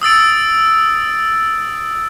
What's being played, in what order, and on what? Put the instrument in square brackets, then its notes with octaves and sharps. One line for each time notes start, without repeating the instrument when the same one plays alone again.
[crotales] D#6 E6 A6 D7